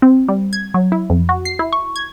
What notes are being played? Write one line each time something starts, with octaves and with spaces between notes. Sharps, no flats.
C4
G3
G#6
F#3
E4
F2
F#4
C7
E4
C#6
G#6